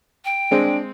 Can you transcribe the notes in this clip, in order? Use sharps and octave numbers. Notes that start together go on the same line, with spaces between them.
G5
G#3 C4 D4